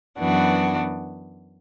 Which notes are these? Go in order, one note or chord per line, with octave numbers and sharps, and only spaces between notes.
F#2 E3 B3 D4 F#4